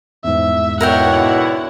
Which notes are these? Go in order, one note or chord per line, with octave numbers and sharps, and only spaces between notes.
E2 G#2 E5
B2 D3 E4 A#4 C#5 E5 F#5 G5